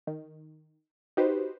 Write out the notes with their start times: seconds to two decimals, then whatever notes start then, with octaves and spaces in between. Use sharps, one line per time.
0.07 D#3
1.17 D#4 F#4 G4 B4 C5